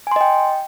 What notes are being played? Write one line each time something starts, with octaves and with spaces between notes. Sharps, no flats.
D#5 G5 G#5 C6